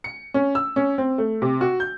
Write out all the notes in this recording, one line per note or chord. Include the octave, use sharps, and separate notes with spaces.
C#7
C#4
E6
C#4
C4
A3
C3
F#4
G6